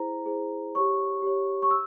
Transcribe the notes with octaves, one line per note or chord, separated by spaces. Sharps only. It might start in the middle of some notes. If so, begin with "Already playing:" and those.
Already playing: E4 G#4 C5 A#5
E4 G#4 C5
G4 C#5 C#6
G4 C#5
C#6
E6